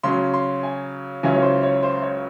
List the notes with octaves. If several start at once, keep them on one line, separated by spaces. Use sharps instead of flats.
C#3 F#3 C#4 C6
C6
G#5
C#2 C#3 F#3 C#4 E4 G#5
C#5
C5
C#5
C5
C#5